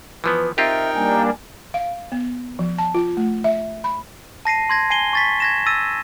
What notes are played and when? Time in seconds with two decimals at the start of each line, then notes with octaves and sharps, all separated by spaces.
0.24 E3 F3 B3 B4
0.58 C4 D#4 F4 G4 A#4 E5 G5
0.95 G3 A#3 D4 G#5
1.74 F5
2.12 B3
2.59 F3
2.78 A5
2.94 F4
3.17 A3
3.44 E5
3.84 B5
4.45 A5 A#6 C7 D#7
4.69 C6 G#6 A#6
4.90 G#5 C7 D#7 G7
5.13 C#6 A6 B6
5.40 G#6 A#6 E7
5.66 E6 A6 A#6 D#7